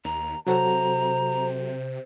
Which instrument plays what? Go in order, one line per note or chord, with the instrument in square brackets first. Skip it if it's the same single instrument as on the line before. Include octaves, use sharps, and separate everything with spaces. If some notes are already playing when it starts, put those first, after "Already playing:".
[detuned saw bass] D#2 [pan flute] A#5
[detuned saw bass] C3 [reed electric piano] F#3 F#4 A4 [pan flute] C5 [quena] A#5